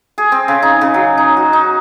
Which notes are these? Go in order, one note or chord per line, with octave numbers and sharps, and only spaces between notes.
G#4
C4
C#3
D#4
C#3
F#3
D#4
F#4
D#4